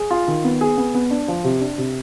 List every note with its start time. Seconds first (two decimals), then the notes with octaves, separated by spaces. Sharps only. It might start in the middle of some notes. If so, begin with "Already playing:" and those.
Already playing: G#4
0.11 F4
0.28 D#3
0.44 B3
0.61 G#4
0.78 B3
0.95 B3
1.11 D4
1.28 F3
1.44 C3
1.61 D4
1.78 C3